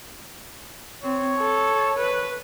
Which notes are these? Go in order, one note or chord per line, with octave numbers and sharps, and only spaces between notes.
C4 C#5
A4
B4